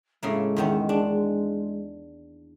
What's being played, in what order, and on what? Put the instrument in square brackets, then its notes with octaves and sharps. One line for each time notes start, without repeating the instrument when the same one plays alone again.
[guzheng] A2 C#3 A#3 [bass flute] G#3
[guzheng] E2 D#3 C#4
D4